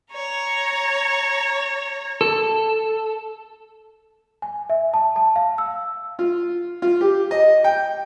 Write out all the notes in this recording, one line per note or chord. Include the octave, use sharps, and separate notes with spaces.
C#5 A#5
A4
G#5
E5
A5
A5
F5
E6
F4
F4
G4
D#5
G5